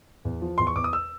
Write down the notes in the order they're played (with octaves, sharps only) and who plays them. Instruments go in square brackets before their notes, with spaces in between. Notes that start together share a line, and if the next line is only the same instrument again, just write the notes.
[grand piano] E2
F3
E2 C6
C#6
E2 D6
D#6
E6